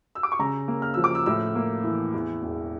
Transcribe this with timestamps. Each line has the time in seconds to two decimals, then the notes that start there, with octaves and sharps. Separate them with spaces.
0.15 E6
0.23 D6
0.32 C#6
0.39 C#3 A#5
0.68 A#3
0.82 F6
0.94 F3 E6
1.04 D6
1.15 E6
1.26 A2 E6
1.55 A#3
1.84 E3
2.14 E2
2.42 E1